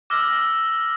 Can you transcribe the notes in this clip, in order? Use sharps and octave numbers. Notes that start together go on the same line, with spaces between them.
D6 E6 F6 A#6 G7